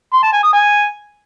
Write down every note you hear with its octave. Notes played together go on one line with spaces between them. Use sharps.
C6
A5
G#5
D#6
G#5